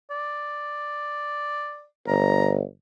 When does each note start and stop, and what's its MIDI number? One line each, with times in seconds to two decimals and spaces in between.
0.11 1.85 74
2.08 2.62 31
2.08 2.52 82